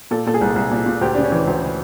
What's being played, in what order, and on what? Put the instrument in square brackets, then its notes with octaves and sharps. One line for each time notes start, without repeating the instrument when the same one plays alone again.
[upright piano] A#2 A4
A#2 A4
G#4
C2
C2
A#2
A#2
D2 G4
C#3 D4
C#4
E3
D2